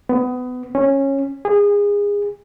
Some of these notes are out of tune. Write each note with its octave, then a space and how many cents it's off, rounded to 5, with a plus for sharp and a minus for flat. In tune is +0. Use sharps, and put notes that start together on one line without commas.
B3 +25
C#4 -15
G#4 -25